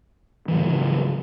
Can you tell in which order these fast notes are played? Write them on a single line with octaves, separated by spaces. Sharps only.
E3 G#2 F#3 C#3